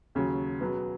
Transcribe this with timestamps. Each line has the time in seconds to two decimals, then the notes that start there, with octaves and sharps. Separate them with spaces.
0.15 D#2 C#3 F#3
0.60 C#2 B2 F#3 B3